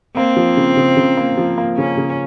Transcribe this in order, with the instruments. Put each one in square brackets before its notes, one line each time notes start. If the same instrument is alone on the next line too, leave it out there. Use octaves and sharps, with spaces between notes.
[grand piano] A#3 [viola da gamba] C4
[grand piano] F3
C#3
C#3
C#3
A#3
F3
A#3
[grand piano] C#3 [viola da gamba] C#4
[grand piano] C#3